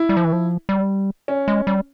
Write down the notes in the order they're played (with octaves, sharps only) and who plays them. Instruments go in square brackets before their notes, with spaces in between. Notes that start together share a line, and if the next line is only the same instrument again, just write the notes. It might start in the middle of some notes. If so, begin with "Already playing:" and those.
Already playing: [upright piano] E4
[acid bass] G3
F3
E3
F3
G3
[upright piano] C#4
[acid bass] G#3
G3